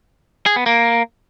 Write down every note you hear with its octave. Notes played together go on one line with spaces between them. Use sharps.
G#4
B3
A#3